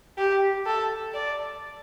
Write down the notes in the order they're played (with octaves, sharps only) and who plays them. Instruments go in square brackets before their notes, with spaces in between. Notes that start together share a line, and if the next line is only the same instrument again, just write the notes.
[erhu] G4
A4
D5